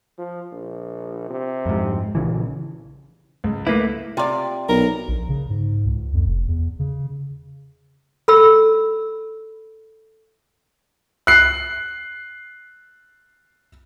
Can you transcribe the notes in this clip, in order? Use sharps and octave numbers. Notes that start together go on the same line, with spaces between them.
F3
A#1
C3
F2 G#2
A#1 C#3 E3
C#2
A3 A#3 E4 B4 D6 B6
C3 F4 D5
B1 A#4
A#1
C#3
G#2
C#2
F2
F1
E2
C#3
A4 B5 E6
F#6 C7